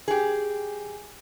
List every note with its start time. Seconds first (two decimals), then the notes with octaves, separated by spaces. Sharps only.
0.08 G4 G#4